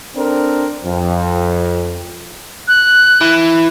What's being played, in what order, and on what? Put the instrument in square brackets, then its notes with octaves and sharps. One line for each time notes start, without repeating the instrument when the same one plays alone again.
[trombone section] C4 D4 A4 A#4
F2
[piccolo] F#6
[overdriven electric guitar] E3